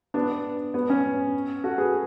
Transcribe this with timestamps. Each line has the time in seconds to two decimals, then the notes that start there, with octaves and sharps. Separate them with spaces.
0.14 B3 D4
0.74 B3
0.90 C#4
1.64 F#4 A4
1.78 G#4 B4